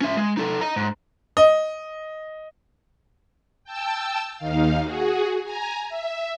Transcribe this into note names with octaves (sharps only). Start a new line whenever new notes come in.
C#4 E5
G#3
D#4 A4
D#5 A#5
G#2
D#5
G5 A5 E6
D#2 D#3 F5
F#4 G#4
G#5 A#5
E5